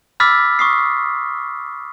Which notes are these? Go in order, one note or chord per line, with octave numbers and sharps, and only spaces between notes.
B5 D6 E6 F6 A6 B6
C#6 D#6 C7